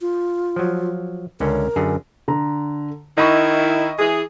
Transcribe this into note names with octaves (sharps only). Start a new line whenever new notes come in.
F4
F3 F#3
C#2 D3 C#4 A#4
F#2 D3 G#4
D3 A#5
D#3 E4 D#5 B5 C#6
E3 G#4